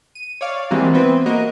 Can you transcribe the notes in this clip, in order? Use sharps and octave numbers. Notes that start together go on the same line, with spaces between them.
D#7
C#5 D5 F5
E3 G3 G#3 A#3 C4 F#4
E3 B3 C4 B4
A#3 F#4 A#4 D#5